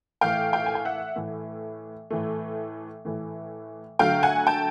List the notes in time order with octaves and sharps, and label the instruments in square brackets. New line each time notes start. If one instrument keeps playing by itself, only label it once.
[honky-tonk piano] A2 E3 A3 F5 G5
F5 G5
G#5
G5
E5 F#5
A2 E3 A3
A2 E3 A3
A2 E3 A3
D3 F#3 A3 F5 G5
F#5 G#5
G5 A5